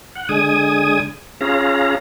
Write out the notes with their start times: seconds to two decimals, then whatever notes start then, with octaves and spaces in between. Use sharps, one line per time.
0.15 F#5
0.29 D3 G#3 G#5 D#6
1.41 C#4 F4 G#4 F5 A#5